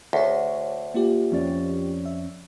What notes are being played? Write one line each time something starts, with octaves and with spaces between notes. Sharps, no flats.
D2 G#4 C#5
A#3 F4 G4
F2 C#4 D5
E5